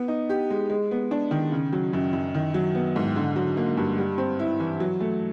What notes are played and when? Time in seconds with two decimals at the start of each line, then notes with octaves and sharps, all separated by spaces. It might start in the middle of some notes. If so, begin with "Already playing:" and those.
Already playing: B3
0.08 D#4
0.29 G4
0.50 G#3
0.70 G#3
0.91 B3
1.11 D4
1.31 D#3
1.52 C#3
1.73 F#3
1.93 F#2
2.13 F#2
2.35 D#3
2.54 F#3
2.75 B3
2.96 G#2
3.16 D3
3.36 F#3
3.57 A#3
3.77 G2
3.98 G3
4.18 C4
4.40 E4
4.60 E3
4.80 F#3
5.00 A3